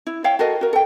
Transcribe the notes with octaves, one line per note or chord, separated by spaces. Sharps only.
E4
C#5 E5 F5 G5
F#4 A4 A#4 D#5
F#4 A#4
A4 G5